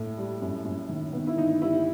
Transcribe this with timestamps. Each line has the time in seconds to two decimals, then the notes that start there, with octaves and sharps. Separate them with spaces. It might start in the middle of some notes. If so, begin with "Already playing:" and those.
Already playing: A2
0.18 G3
0.42 F#2
0.65 F#2
0.89 D#3
1.13 D#3 B3
1.27 E4
1.37 G1 D#4
1.62 G3 E4